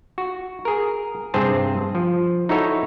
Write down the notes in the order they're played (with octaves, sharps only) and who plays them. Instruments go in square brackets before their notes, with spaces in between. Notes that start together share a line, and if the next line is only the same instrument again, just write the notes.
[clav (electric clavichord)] F#4
G#4 A#4
G2 C3 C4 G#4 A5
F3
D#4 E4 F#4 A4 C#5